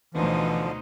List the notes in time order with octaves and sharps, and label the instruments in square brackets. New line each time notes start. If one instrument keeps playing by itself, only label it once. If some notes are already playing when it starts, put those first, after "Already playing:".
[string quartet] D2 B2 [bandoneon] D3 F3 [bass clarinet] E3 [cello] D#4 C5